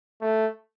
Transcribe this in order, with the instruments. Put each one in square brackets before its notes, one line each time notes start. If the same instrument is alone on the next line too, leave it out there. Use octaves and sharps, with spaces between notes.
[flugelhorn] A3